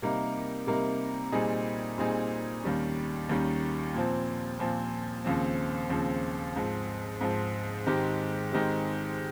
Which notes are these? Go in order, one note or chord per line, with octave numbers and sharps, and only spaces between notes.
C3 G3 A#3 D#4 A#4
C3 G3 A#3 D#4 A#4
A#2 G3 C4 D#4 G#4
A#2 G3 C4 D#4 G#4
D#2 D#3 G3 C#4
D#2 D#3 G3 C#4
A#2 F3 C4
A#2 F3 C4
D#2 C#3 F3 C4
D#2 C#3 F3 C4
G#2 F3 C4
G#2 F3 C4
G#2 D#3 G#3 C4 G4
G#2 D#3 G#3 C4 G4